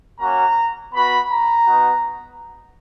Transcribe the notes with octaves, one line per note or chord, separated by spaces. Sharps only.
A#3 C#4 F#4 A#5
B3 F#4 B5
A#5
B3 D#4 F#4